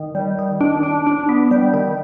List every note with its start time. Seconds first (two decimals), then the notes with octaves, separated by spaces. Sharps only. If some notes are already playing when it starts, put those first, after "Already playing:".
Already playing: D#3
0.15 G3
0.39 D#3
0.61 D4
0.83 D4
1.07 D4
1.29 B3
1.51 G3
1.74 D#3